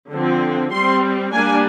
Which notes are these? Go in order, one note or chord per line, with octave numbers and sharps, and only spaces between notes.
D3 F3 C4
G3 C4 C6
G3 A#3 D4 G#5